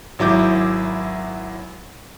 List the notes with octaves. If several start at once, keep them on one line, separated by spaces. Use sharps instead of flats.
G#1 F#3 E4 D6 G6